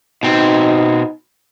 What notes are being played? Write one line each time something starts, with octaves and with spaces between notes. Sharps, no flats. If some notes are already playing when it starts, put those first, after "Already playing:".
B2 C4 D#4